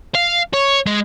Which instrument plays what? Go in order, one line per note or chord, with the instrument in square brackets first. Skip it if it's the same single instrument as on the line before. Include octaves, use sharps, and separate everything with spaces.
[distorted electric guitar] F5
C#5
G#3